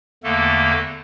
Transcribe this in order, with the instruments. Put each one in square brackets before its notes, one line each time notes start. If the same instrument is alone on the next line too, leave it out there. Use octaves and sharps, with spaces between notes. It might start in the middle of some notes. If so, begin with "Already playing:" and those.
[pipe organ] E2 D3 A3 A#3 A4